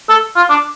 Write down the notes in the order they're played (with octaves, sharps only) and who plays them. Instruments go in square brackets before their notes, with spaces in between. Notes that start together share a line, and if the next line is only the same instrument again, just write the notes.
[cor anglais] A4
F4
D4